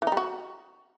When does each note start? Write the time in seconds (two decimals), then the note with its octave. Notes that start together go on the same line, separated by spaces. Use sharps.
0.02 E3
0.07 D#4
0.12 G3
0.17 F#4